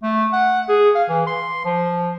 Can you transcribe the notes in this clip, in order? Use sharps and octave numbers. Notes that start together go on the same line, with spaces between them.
A3
F#5
G#4
F5
E3
C6
F3